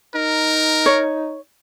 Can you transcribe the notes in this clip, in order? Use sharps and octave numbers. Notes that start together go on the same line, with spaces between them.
D#4 A#4
C#5